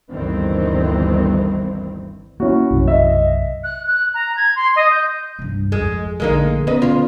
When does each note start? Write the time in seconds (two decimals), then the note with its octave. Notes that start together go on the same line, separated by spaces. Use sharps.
0.11 G1 D2 G2 D#3 E3 C4
2.40 A#3 C#4 E4 F#4
2.70 B1 F#2 C3
2.88 D#5 E5
3.64 F#6
3.88 F#6
4.14 A#5
4.37 G#6
4.56 C6
4.76 D#5
4.91 G6
5.39 C2 G2
5.72 G#1 F2 G#3
6.20 A#1 D3 G#3 A#3 D#4
6.67 D#2 B3 C#4 B4 D#5
6.82 D2 F4